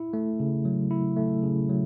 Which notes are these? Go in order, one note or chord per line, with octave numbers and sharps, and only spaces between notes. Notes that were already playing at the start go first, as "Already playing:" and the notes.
Already playing: E4
A3
C#3
F#3
E4
A3
C#3
F#3